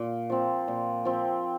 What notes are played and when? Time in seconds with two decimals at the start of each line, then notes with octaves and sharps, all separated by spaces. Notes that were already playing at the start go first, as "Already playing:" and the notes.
Already playing: A#2
0.30 F3 C4
0.68 A#2
1.05 F3 C4